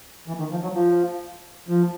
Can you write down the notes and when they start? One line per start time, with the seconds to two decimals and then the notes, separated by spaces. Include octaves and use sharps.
0.28 E3
0.39 D#3
0.51 F3
0.63 F#3
0.75 F3
1.68 F3